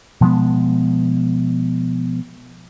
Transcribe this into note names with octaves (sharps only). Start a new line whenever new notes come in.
B2 F3 G#3 B3